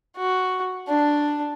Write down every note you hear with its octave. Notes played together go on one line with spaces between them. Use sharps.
F#4
D4